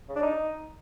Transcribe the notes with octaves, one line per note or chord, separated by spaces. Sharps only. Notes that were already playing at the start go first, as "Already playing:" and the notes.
C#3
D4
D#4